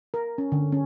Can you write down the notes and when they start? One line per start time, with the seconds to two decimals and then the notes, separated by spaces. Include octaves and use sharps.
0.14 A#4
0.38 C#4
0.52 D3
0.72 C#4